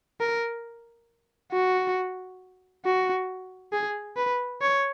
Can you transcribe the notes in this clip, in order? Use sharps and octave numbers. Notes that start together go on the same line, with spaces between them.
A#4
F#4
F#4
G#4
B4
C#5